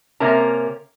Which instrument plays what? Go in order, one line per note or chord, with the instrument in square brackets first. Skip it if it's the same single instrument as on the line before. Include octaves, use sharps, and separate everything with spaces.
[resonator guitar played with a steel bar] C3 A#3 C#4 A#4 A#5